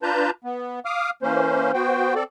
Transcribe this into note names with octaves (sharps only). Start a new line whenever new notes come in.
D4 F4 B4 A5 A#5 G6
B3
F5 D6 D#6 F6
E3 A#3 C#4 C5
B3 F#4 C5 G5
C4 A4 D5